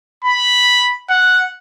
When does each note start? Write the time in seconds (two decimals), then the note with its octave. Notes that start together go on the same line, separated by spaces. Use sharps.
0.25 B5
1.09 F#5